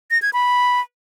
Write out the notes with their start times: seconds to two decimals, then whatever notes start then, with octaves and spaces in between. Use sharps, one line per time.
0.11 A#6
0.22 G#6
0.33 B5